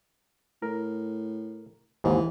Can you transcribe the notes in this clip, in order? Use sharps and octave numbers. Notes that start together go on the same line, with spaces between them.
A2 A#4
D#2 G#2 E3